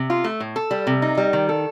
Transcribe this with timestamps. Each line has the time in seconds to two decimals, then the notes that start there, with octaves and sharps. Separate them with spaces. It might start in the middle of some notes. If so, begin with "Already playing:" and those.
Already playing: C3
0.10 F4
0.24 A3
0.40 A2
0.56 A4
0.71 G3
0.87 C3
1.02 D#4
1.17 G3
1.33 D#3
1.49 A4